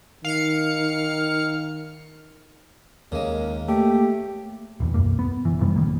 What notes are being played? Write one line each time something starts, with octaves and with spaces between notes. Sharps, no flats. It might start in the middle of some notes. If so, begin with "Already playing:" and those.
D#3 F5 C#7
D#2 C#3 G#3 A#3
A3 A#3 G4
D#1 E2
B1 F#2 A#3
B3
F#1 E3
F#2 C3 G3 B3
A#1 D#3 A#3